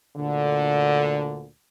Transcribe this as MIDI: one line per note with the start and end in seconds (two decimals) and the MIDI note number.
0.17 1.48 38
0.17 1.48 46
0.17 1.48 50